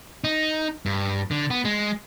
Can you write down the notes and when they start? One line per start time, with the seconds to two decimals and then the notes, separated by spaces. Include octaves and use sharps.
0.24 D#4
0.86 G2
1.31 D3
1.50 B3
1.65 G#3